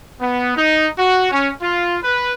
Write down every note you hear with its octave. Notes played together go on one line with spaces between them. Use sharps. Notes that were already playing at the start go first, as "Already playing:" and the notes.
B3
D#4
F#4
C#4
F4
B4